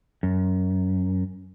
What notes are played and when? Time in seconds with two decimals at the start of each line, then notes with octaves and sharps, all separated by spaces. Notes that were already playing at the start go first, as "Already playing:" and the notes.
0.23 F#2